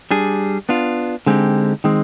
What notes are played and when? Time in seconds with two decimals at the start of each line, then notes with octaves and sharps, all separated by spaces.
0.11 G3 D4 G#4
0.69 B3 D4 F4
1.26 D3 G#3 C4 D#4 G4
1.84 D#3 G#3 C4